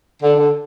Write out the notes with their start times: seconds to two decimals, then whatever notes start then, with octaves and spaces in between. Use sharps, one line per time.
0.22 D3
0.37 D3